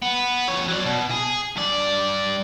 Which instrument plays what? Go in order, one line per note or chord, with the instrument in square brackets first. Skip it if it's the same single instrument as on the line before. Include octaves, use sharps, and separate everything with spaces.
[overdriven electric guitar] B3
F2 C#5
F#3 D5
B2
G#4
G2 D5